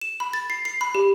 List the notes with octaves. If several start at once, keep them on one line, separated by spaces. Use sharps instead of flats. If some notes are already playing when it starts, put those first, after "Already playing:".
E7
B5
A6
C7
C7
B5
G4